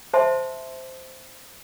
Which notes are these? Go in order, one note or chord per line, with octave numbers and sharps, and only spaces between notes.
C5 E5 A5 C6